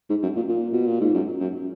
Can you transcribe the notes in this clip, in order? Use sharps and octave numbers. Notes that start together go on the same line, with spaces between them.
G#2
F#2
A#2
A#2
B2
A#2
G#2
F#2
F#2